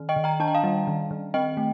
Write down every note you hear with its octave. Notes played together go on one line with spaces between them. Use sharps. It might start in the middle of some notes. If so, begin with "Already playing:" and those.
Already playing: D#3
D#5 G5
D#3
G5 A#5
D4 A5
G5
F5 A5
G3
D#3
D#3
C4 D#5 G5
A3